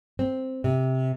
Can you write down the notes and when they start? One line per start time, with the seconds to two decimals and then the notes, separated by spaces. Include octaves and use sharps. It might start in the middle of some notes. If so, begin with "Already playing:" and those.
0.19 C4
0.64 C3